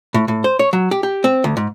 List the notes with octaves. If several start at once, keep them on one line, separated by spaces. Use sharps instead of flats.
A2
A2
C5
C#5
F#3
G4
G4
C4
D2
G#2